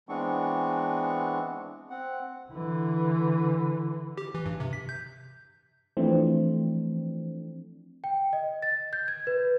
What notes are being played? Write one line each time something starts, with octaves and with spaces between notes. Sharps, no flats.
E3 G#3 B3 C4 D4 C#6
C4 F#5
D3 E3
G4
E3
G2
C3
B6
G6
E3 F3 A3 C4 D4
G5
D#5
A6
G6
G#6
B4